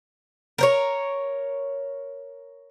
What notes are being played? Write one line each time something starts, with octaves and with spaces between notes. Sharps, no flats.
A#4 C5 C#5